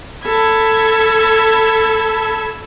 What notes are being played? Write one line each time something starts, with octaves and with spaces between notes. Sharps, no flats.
A4 B5 G#6